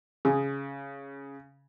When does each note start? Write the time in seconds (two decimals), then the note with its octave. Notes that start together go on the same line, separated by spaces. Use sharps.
0.25 C#3 G#4